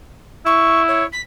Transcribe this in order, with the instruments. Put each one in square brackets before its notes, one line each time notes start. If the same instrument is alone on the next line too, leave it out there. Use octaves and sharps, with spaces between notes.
[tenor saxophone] E4 [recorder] C#6
[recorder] C#5
B6